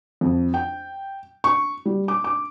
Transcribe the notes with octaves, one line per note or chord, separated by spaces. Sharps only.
F2
G5
C#6
G3
D6
D6